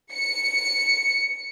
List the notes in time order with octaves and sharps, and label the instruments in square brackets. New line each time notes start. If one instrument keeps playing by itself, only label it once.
[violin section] C#7